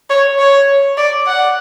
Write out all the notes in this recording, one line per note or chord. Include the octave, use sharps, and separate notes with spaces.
C#5
C#5
D5
F#5